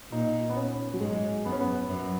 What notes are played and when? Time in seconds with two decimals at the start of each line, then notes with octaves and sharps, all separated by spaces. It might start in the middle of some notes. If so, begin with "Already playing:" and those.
0.12 A#2 D#4
0.49 B3
0.56 C#4
0.94 F#3
1.00 G#2 G#3
1.45 F#2 B3
1.52 C#4
1.60 B3
1.89 F#2